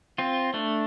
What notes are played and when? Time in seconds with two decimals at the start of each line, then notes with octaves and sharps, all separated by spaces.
0.18 C4 F4
0.54 A3 D4